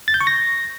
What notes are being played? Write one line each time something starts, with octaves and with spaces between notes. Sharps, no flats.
A6
G6
C#6
A#6